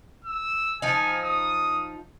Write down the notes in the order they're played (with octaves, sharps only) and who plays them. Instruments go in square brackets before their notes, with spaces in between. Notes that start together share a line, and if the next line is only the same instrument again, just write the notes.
[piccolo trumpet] E6
[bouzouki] F3 D#4 [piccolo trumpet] G#5
[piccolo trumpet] D#6